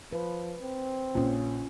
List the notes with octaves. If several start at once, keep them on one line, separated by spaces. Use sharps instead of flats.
F3 B4
C4
A#1 C#4 F4